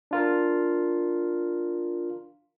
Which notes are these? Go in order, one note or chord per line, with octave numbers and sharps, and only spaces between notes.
D4 F4 A#4